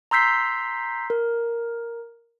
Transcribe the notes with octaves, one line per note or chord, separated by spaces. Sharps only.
A#5 C6 E6 G6 B6 C7
A#4